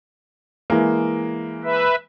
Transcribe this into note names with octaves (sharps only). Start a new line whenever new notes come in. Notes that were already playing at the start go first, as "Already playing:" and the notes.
E3 G#3 A#3
B4 E5